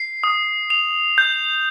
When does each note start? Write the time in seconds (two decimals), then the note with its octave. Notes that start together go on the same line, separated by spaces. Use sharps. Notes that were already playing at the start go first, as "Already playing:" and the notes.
Already playing: C7
0.24 D#6
0.70 F7
1.18 G6